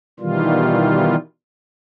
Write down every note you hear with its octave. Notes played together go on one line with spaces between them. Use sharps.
B2 D#3 E3 G3 F4